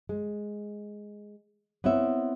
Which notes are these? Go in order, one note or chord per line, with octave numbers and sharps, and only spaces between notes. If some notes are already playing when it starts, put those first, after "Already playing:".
G#3
B3 C4 E4 C#5 E5